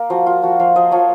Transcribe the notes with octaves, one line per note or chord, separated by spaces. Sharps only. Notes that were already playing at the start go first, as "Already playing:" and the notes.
Already playing: A#3
F3 F#4
F4
F3 F#4
F3 F5
F3 D#5
F3 C#5